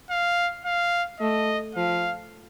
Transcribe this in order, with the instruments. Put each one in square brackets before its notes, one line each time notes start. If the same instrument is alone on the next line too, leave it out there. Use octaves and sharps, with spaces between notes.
[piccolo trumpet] F5
F5
[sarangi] A3 [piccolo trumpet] D#5
[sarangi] F3 [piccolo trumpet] F5